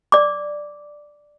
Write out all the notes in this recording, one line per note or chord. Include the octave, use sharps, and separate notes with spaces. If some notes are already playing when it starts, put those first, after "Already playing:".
D5 D6